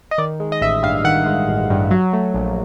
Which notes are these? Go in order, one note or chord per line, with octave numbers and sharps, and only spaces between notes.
D#5
D#3 D5
G#3
D#5
A1 E5
G2 F5
D#3 F#5
G#3
A1
G2
F#3
A3
A#1